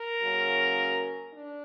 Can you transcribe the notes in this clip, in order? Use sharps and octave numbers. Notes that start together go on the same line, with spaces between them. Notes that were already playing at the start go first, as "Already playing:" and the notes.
Already playing: A#4
C#3 F#3 A#3 C#4
D4